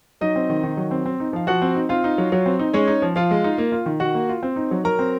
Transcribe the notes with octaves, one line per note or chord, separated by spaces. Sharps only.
F#3 D#4 D#5
C4
D#3
D#3
F#3
C4
C4
D#4
F3 F5
F3 F#4 F#5
C4
D#4
C4 F4 F5
D#4
F#3
F#3
C4
D#4
G#3 C#4 C#5
D#4
F3
F3 F4 F5
G#3
D#4
A#3
F4
D#3
D#3 F#4 F#5
A#3
F4
C4
D#4
F#3
F#3 A#4 A#5
C4